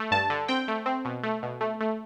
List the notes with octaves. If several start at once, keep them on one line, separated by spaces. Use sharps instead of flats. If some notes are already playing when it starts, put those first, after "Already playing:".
Already playing: A3
G2 A5
D3
C4 G5
A3
C4
B2
A3
B2
A3
A3